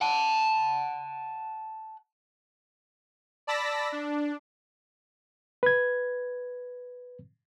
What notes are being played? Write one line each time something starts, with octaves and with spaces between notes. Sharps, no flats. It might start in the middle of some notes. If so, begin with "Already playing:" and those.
F#5 A5
D5 A5 B5 E6 A#6 B6
D4
B4 G#6